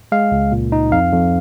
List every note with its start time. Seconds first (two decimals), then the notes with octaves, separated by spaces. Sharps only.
0.12 G#3 F5
0.32 C#2
0.52 A#2
0.72 D#4
0.92 F2 F5
1.13 F2